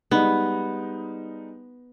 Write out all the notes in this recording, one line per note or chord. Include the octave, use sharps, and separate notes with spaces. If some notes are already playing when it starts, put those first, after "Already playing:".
G3 G#3 B3 D#4